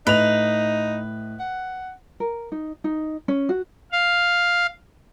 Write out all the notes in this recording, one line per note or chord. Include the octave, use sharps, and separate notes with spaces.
A2 D#4 B4 D#5 F7
F#5
A#4
D#4
D#4
C#4
F#4
F5